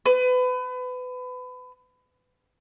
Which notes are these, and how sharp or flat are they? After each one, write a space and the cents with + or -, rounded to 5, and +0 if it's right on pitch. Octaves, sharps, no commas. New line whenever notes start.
B4 +30